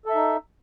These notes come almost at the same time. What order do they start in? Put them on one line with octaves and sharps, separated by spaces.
A4 E5 D#4